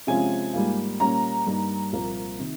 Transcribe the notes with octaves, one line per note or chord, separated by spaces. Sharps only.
C3 F3 G#3 C#4 F4 G#5
G#2 G3 A#3 F4
A#2 G3 A#3 C#4 A#5
G2 G3 A#3 D#4
C2 A#2 F3 A#3
C3 D#3